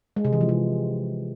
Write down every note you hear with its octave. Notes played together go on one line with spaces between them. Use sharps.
G#3
C3
E3
F3
C3